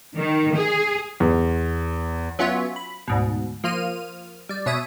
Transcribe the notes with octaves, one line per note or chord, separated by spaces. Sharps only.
D#3
G#4
E2
F#3 B3 C#4 F4 C#5 E5
B5
D2 G#2 B2
F3 A#3 F4 F6 D#7
G3 D5
B2 C#5 E5 D#6 D#7